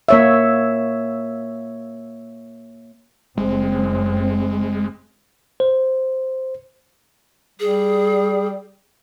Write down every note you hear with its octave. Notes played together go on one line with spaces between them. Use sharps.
A#3 C#5 E5
F#1 G#3 C4
C5
G3 G#4